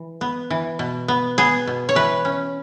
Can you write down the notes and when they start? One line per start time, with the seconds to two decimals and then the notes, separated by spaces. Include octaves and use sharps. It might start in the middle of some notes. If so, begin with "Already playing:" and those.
Already playing: E3
0.21 B3
0.50 E3
0.79 B2
1.08 B3
1.38 B3 G#4
1.67 B2
1.89 C#5
1.95 E3 B4
2.25 C#4